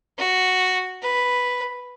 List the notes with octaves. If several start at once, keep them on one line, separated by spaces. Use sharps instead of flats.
F#4
B4